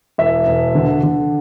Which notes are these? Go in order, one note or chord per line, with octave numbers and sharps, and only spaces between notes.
E1 E5
E1
D3
D3